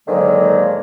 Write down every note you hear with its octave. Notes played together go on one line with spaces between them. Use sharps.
G#2 D3 D#3 F#3 G#3 A#3